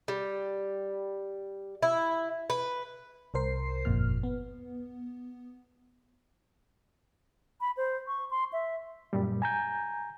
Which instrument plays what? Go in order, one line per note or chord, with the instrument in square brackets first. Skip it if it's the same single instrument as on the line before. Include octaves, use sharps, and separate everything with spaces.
[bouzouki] G3
E4
B4
[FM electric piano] C2 A#4 C5 C7
G1 F2 A#2 F6
B3
[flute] B5
C5
C#6
C6
E5
[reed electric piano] F#2 A#2 G3
G#5 A#5 G6